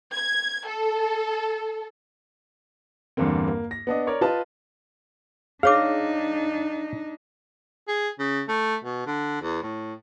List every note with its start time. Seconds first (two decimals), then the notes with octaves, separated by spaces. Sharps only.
0.14 G#6
0.68 A4
3.17 E2 G2 D3 A#3 C4
3.48 A#3
3.71 A#6
3.87 B3 D4 D#5
4.07 A#4 C#5 D5
4.21 F4 B4 D#5 A5
5.63 D4 D#4 G#4 C#5 F5 D6
7.88 G#4
8.19 C#3
8.49 A3
8.84 B2
9.06 D3
9.42 E2
9.63 A2